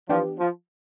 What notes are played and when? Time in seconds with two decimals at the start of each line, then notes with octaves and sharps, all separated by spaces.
0.09 E3 F3 B3 D4 G4
0.39 F3